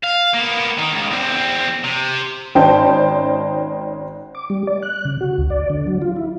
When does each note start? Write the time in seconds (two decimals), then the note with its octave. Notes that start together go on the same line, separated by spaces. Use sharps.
0.04 F5
0.34 A#3 B3
0.78 D#3 D#4
0.93 C#2
1.11 E2 C4
1.84 C3
2.55 G#1 C#4 D#4 C5 G5 A5
4.35 D6
4.50 G3
4.67 D5
4.83 F#6
5.05 C#3
5.21 F#4
5.38 D2
5.50 D5
5.70 D3
5.87 F#3
6.02 F4
6.16 E4